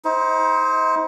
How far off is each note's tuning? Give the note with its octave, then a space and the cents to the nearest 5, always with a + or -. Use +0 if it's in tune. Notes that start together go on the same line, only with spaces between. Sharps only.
D#4 +40 C5 +0